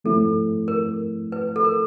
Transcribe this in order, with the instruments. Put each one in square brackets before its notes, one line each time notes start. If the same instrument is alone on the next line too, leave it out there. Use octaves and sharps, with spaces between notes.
[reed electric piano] F3 A3 C4 E4 [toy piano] A4
[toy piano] A#4
B4
A4
A#4